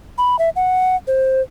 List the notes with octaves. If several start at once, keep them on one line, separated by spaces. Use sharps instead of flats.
B5
E5
F#5
C5